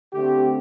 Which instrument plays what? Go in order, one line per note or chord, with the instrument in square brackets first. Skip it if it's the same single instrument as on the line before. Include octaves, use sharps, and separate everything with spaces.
[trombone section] D3 A3 C4 G4